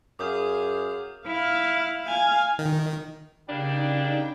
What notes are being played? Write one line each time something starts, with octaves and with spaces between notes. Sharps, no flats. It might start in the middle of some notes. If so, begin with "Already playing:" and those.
F#2 G#4 F5 D6 D#6 G6
E4 F5
F5 G#5
D#3
C#3 G3 A#3 D4 D#4 G5